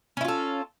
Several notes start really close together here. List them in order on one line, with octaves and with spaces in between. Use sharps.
C#4 E4 F4 A4